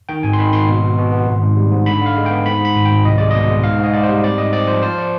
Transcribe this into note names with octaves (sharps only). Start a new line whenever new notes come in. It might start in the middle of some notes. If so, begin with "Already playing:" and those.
D#3 G5
G#1 G#5
C6
D#3 B5
G#1 C6
B2
B3
B2
B3
G#1
G#2
G3
G#2
D3 B5
D3
F5
G#3
B3 G5
G#2 B5
G#2
B5
G#1
G5
G#1
C2 D#5
G#3 D5
B2 D#5
G#3
G#2 F5
G#2 D#5
G#2 D5
G3 C5
C4 D5
G#2 D#5
C4 D5
F3 C5
F3 C5
D5